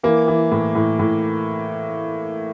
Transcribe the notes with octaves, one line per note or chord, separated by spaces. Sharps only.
E3 A#3
E3
A2
A2
A2